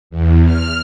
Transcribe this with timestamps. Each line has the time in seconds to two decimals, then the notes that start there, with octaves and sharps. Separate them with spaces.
0.10 E2
0.46 F6